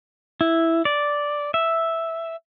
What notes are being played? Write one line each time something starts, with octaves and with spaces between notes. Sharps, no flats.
E4
D5
E5